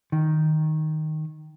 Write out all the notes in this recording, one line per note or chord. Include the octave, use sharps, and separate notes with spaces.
D#3